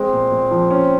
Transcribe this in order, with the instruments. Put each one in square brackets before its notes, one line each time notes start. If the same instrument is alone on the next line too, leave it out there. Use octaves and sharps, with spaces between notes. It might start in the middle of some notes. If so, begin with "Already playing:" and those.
Already playing: [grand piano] G#3 [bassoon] C4
[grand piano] A#2
A#2
F3
C#4